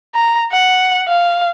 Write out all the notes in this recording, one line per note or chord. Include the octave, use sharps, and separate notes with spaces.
A#5
F#5
F5